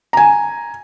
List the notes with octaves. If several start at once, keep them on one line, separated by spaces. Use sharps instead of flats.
G#5 A#5